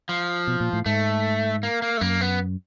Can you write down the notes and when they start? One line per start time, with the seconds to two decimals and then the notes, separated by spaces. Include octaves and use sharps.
0.09 F3
0.47 B2
0.60 A#2
0.73 A2
0.86 G#2 A3
1.63 A#3
1.82 A#3
1.97 A3
2.01 F#2 A#3
2.21 B3